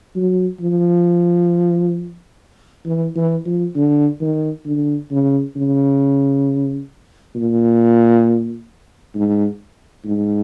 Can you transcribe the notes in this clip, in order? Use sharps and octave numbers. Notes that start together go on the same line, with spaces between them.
F#3
F3
E3
E3
F3
D3
D#3
D3
C#3
C#3
A#2
G#2
G#2